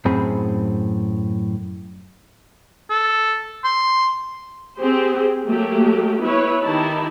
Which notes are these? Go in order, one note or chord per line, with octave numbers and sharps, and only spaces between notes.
F#2 A2 C4 G#4 B5
A4
C6
C4 G4 G#4 C5
F#3 A3 A#3 G4
B3 E4 B4 C#5
D#3 D#4 E4 G4 A5